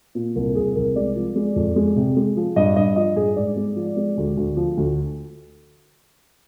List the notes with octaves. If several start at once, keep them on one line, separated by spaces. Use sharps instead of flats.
A#2
C2 A#4
A#4
C2 G#4
C2 A#4
G#3 D5
F3
G#3
F2
G#3
C3
G#3
F3
G2 D#5
G2 D#5
F3 D#5
G2 G#4
G#2 D5
G#3
F3
G#3
D2
D2
F3
D2